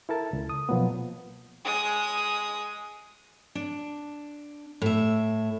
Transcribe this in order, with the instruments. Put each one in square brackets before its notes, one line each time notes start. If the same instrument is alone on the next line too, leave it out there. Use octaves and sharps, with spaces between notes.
[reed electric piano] E4 A4 A#4 A5
C#2
D#6
B2 F3 F#3 A#3 B3
[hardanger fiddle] G#3 D#6
[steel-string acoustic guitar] D4
A2 E5